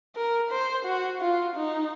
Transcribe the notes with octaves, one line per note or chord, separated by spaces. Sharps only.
A#4
C5
F#4
F4
D#4